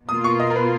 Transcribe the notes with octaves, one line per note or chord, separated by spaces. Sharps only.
B2 A#3 F4 D#6
C#6
D#5
A#4
B4